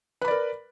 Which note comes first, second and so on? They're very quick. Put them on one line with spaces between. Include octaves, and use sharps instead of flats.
B4 B5 D5 A#4